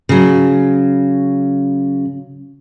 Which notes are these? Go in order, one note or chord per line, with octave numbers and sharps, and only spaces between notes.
C#3 F#3